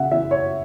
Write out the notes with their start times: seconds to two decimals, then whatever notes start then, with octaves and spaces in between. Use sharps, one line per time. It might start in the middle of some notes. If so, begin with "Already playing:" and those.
Already playing: C#3 E5 F#5
0.11 E3 E5
0.31 C#5